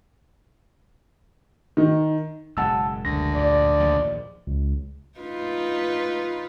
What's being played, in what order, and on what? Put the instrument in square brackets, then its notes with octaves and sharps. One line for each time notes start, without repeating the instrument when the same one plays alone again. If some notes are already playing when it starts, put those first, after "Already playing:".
[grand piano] D#3
[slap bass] F#1 B2 G#3 [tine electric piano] F#5 A5 E6
[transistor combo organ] D2 [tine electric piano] A#6
[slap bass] A#1 G2 [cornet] D5
[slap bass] A#1 D#2 F3
[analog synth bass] C#2
[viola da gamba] D#4 F4 B4